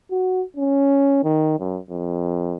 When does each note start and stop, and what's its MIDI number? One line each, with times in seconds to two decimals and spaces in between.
0.11 0.42 66
0.57 1.19 61
1.24 1.59 51
1.60 1.79 42
1.90 2.56 41